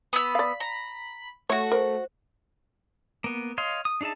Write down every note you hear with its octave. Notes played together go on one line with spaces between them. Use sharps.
B3 B5 E6
D5 F5
A#5
A3 F#4 C#5 C#6
A#4 C5
A#3 B3
C#5 D#5 F5 C6
D#6
D4 D#4 G#4 E5 A5